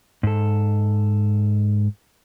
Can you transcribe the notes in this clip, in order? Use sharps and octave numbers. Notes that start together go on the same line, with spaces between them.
G#2 A4